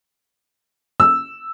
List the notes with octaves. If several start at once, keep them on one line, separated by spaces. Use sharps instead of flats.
E6